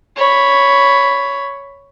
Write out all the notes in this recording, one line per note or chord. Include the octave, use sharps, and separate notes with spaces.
C#5 B5